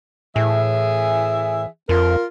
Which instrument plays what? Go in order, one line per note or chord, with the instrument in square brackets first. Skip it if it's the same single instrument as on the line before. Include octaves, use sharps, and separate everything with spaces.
[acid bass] A2 [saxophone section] E3 G#4 E5
[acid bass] F2 [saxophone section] F4 A#4